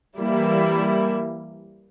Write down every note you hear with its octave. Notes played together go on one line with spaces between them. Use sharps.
E3 G3 A#3 E4